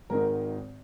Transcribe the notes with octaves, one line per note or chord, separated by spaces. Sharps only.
G#1 G#2 D#3 A#4